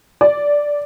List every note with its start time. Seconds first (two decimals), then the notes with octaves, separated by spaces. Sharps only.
0.21 D5